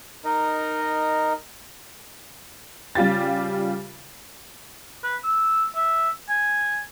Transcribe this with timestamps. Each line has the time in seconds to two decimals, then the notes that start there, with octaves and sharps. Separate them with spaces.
0.25 D#4 A#4 D#5
2.95 C#3 G3 F4 G4 A6
5.03 B4
5.24 E6
5.75 E5
6.29 G#5